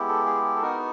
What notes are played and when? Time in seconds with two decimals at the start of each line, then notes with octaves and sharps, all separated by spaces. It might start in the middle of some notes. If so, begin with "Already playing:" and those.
Already playing: G#3 B3 E4 G4
0.08 A4
0.26 G#4
0.56 A4
0.62 B3 D#4 F#4 A#4